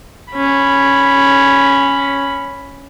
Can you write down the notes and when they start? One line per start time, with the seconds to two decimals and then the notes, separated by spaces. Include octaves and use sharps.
0.33 C#4 B5